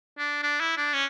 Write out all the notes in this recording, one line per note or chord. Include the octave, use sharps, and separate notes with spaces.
D4
D4
E4
D4
C#4